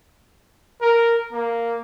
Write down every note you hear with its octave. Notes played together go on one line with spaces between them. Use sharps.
A#4
A#3